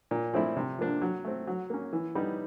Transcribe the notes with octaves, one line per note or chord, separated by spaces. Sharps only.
A#2
F3 A3 C4 E4
C3
F3 A#3 D4
F#3
A3 C4
F#3
A#3 C#4
E3
G3 B3 D#4